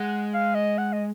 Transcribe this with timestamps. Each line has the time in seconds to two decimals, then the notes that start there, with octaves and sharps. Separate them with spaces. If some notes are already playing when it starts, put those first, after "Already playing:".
Already playing: G#3 F#5
0.34 F5
0.55 D#5
0.78 F#5
0.93 D#5